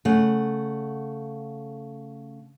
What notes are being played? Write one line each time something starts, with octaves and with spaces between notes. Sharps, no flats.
C#3 A3 F#5